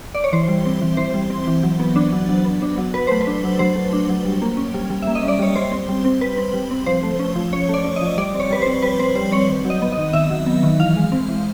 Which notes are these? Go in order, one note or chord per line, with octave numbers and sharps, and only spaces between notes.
D5
C#5
E3 C5
G3
C4
E3
E3 C5
G3
C4
E3
F#3
B3
D4
F#3
F#3
B3
D4
F#3
F#3 B4
A3 C5
B4
D4
F#3
F#3 C5
A3
D4
F#3
G3
A#3
C#4
G3
G3
A#3 E5
D#5
C#4
D5
G3 C#5
G3 C5
C4
G3
C4
G3 B4
C4
G3
C4
F3 C5
A3
C#4
F3
F3 C#5
A3
D5
C#4
D#5
F3
G3 D5
C4
C#5
G3 B4
C4 C5
G3 B4
C4 C5
G3 C5
C4 C#5
D#3
F#3
D#5
B3
D#5
D#3
D#3 E5
F#3
B3
D#3
E3 F5
G#3
C4
E3